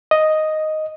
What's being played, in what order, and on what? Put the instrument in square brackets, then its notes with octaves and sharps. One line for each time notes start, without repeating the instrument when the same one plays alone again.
[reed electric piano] D#5